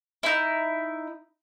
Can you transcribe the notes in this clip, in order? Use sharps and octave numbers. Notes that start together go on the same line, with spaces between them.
D#4 E4